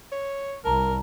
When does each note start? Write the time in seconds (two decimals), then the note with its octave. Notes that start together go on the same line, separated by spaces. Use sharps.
0.12 C#5
0.65 C2 A#4 A5 A#5